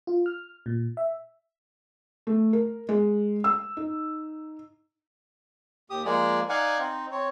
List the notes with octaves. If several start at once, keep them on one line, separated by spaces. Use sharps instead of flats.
F4
F6
A#2
E5
A3
A#4
G#3
E6
D#4
D#2 G4 D#6
F3 G#3 A#3 G#4 D5
D#4 D5 F5 F#5 G#5
C4 D#4
C4 C#5